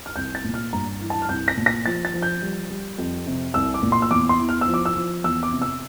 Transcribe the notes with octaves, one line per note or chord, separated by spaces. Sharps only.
F6
C2 G6
A6
A#2
F6
G2 A#5
E3
A5
F6
C2 G6
A#6
A#2
A#6
F3 A6
A6
F3
G6
G3
G3
F2
C3
C2 E6
D6
A#2
C6
E6
E2 D6
C6
E3
F6
E6
F3
D6
E6
F3
E2 E6
D6
C3
E6